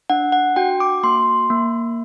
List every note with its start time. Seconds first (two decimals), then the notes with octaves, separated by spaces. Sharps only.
0.10 D4 F#5
0.32 F#5
0.56 F#4 G5
0.80 D6
1.03 A#3 C6
1.50 A#3